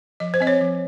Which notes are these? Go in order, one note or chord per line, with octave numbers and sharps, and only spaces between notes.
F3 D#5
C5
C4 D#5
C#5
F3